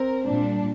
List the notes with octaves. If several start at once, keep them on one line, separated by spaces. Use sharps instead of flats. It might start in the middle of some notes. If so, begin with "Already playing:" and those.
Already playing: C4 A#4
A#2 G3 D4